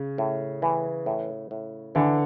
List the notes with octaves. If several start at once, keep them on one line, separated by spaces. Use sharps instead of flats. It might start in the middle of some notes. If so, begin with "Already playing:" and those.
Already playing: C#3
A2
E3
A2
A2
D3 E3